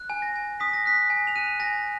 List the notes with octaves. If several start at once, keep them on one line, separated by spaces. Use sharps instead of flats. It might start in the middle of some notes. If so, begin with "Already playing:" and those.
Already playing: F#6
G#5
A#6
G#5
D#6 B6
A#6
F#6 B6
G#5
F7
F#6 D#7
G#5 A#6